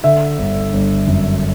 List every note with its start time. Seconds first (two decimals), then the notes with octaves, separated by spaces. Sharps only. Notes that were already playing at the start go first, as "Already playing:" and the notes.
0.04 D3 E5
0.38 G1
0.73 G1
1.07 F#2